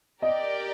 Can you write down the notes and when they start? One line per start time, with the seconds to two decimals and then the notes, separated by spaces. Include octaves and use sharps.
0.22 G4 A#4 D5 D#5 G5